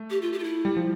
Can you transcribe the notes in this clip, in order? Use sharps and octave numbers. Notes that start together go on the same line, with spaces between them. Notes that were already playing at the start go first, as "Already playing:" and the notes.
Already playing: A3
G4
F4
G4
F4
E4
G3
F3